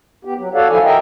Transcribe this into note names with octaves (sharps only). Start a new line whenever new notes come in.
B3 G4
F#3
F#4 A4 C#5 D5 F5 F#5
D#2 D#3 F3 E4 A4 G#5
A#4 D#5 E5 G5